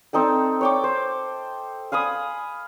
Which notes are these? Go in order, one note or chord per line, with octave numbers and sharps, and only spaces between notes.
C4 D#4 A4 G5
C#5 G5 D6
C5
F5 G#5 B5 D#6